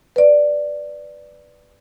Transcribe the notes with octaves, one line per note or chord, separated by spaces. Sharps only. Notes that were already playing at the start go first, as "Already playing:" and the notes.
B4 D5